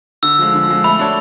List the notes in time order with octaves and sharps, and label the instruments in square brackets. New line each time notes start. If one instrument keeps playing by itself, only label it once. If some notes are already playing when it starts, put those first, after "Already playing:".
[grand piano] D3 [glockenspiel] E6
[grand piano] F3 G#3
D3
F3 G#3
[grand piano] A3 [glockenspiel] B5
[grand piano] D4 F#4 A4 C#5